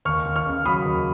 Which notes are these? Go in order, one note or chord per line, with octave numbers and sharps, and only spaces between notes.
D#2 C#6 F6
D#2
C#6 F6
C#3
F#3 B5 D#6
D#2